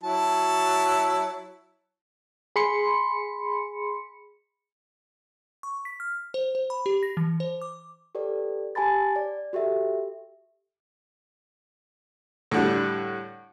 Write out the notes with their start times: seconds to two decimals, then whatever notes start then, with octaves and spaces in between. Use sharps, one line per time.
0.03 F#3 E4 A5
2.56 G#4 B5 C6 C#7
5.63 C#6
5.85 B6
6.00 F6
6.34 C5
6.55 C5
6.70 B5
6.86 G4
7.03 A#6
7.17 E3
7.40 C5
7.61 D6
8.15 G4 A4 B4 D5
8.75 G4 G#5 A5 B5 A6
9.16 D5
9.53 F#4 G4 A4 E5
12.51 A2 D3 G3